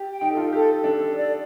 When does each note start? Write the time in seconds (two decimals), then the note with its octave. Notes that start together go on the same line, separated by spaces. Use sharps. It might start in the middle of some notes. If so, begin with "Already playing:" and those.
Already playing: G4
0.10 G5
0.21 D#4
0.32 A4
0.37 F4
0.53 G4 A4
0.73 A4
0.84 D4
0.94 A4
1.15 D5